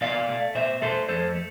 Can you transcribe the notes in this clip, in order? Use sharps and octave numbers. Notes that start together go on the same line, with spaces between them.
B2 D5 F5
A3
B2 C5 E5
A3 A4 C5
F2 A4 C5
A3